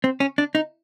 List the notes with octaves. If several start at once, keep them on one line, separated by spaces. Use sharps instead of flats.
C4
C#4
D4
D#4